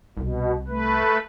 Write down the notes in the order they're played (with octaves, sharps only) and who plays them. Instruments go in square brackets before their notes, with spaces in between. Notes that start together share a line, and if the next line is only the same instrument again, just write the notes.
[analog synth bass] C2 [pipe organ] B2
[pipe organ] A3 B4